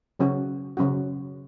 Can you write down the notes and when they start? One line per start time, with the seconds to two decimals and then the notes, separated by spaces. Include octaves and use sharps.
0.19 C#3 F#3 C#4 F#4
0.77 C#3 F#3 C#4 F#4